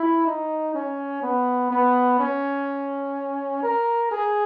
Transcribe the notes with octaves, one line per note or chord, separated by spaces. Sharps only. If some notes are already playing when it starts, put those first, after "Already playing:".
Already playing: E4
D#4
C#4
B3
B3
C#4
A#4
G#4